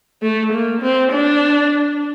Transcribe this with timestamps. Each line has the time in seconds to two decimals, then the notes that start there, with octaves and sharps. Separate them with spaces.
0.22 A3
0.53 A#3
0.82 C4
1.12 D4